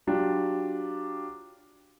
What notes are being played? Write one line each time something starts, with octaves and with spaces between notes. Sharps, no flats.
F#3 D4 F4 G4